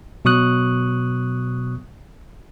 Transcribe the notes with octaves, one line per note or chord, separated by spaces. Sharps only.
B2 F#3 C#6 D#6 F#6